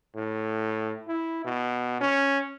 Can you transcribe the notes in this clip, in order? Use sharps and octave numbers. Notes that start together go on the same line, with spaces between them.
A2
E4
B2
C#4